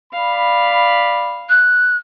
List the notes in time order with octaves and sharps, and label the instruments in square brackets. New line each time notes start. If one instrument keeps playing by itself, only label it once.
[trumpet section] D5 B5 [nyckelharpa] F5
[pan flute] F#6